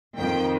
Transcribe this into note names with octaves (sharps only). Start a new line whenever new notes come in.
F2 D#3 G5